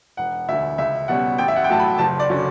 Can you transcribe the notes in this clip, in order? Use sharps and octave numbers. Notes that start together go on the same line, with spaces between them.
E1 F#5
D2 D3 E5
C#2 E5
B2 G3 C#4 F#5
A1 G5
E5
F#5
G5
A2 F#3 A5
B5
F#1 A5
D5
D3 F#3 C#4